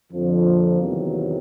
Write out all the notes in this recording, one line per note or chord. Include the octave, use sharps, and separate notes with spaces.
F2 D3 F3
A#3
E2 C3 D#3 F#3